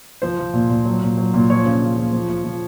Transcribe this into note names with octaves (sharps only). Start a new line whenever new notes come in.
F3 C5
F3
A#2
A#2
F#3
A#2
F#3
A#2
F3 C#5
C#3
C#3
F3
F3
F3
F3